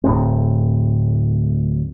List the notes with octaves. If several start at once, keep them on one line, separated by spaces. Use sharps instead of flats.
D1 A2 C4